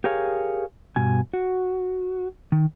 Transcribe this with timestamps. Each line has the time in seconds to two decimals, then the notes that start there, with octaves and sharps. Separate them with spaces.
0.04 G4 G#4 A#4 C#5 F5 G#5
0.96 G2 B2 G#5
1.33 F#4
2.52 D#3